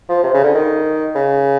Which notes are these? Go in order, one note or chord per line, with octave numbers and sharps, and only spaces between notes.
F3
C3
C#3
D3
D#3
C#3